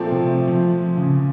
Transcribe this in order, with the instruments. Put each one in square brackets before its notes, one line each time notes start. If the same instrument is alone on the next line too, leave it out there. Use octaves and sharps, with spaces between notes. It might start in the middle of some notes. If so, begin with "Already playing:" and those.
Already playing: [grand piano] A#2 F3 A3 C4
[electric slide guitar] C3
F3
C#3